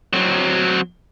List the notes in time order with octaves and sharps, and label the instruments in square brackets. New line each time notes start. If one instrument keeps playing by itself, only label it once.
[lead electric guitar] F#3 C4